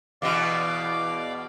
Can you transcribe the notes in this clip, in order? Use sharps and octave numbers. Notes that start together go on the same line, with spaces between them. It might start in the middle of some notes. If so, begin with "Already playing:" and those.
E2 B2 F#4 D5 F5 D6